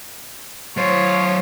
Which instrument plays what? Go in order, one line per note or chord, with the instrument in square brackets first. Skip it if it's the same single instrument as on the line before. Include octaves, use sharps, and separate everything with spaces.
[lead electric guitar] F#3 C5 [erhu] C#5